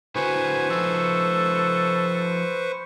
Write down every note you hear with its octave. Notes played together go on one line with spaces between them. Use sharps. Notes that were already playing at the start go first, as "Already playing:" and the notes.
D3 E4 F#4 B4 C5 G#5 C#6
F3 D#4 A4